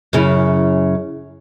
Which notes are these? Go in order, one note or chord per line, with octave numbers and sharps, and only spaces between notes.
F#2 C#3 E4